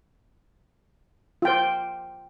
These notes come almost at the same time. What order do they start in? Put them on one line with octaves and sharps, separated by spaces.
F4 G5 C5